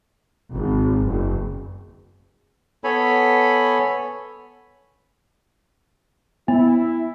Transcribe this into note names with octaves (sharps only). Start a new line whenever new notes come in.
G#1
F#1
B3 A4 C#5 G#5 B5
B3 E4